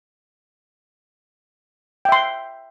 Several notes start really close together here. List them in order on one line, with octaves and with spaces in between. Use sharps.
G5 E5 C6